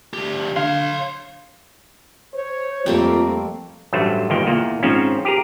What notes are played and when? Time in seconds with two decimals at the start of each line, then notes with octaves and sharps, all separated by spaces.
0.14 D2 G4
0.56 D3 C#5 F5 C6
2.34 C5 C#5
2.86 F2 G3 A3 A#3 C4 F4
3.93 A1 G2 F#3 A3 C5
4.30 G1 D#2 A#2 D#3 G5
4.46 E2 A#2 A#3
4.83 G#2 D#3 F3 C4 C#4
5.25 G4 G#4 A#4